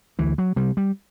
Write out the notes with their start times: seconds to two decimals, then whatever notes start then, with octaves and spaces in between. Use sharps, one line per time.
0.19 D2 E3
0.38 F#3
0.56 C3 G3
0.77 G3